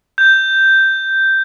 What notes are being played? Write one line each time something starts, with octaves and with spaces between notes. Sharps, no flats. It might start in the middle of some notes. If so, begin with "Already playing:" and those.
G6